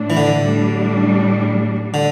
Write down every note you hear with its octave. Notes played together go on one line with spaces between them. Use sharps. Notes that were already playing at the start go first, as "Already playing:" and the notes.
Already playing: A2 A3 D4
E3
D3
A2 G3 D4
D3